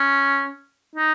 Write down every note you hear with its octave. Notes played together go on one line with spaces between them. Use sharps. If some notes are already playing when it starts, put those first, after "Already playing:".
Already playing: C#4
D#4